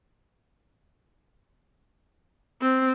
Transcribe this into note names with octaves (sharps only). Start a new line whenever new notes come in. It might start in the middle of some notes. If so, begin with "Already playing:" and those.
C4